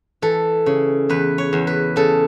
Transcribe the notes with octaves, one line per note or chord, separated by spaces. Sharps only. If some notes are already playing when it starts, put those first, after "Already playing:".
E3 A4
C#3
E2 B4
C#5
E2
B4
C#3 A4